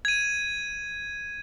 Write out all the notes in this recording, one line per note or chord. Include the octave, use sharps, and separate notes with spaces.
G#6 D#7